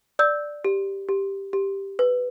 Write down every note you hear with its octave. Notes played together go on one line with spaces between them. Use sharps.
D5 E6 G6
G4
G4
G4
B4